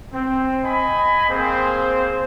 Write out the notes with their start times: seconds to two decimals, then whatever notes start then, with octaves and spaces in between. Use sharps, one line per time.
0.13 C4
0.64 D#5 G#5 B5
1.29 A#3 C4 G#4 C5